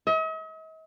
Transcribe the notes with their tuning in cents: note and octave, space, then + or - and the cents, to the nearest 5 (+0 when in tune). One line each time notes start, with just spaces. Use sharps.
D#5 +45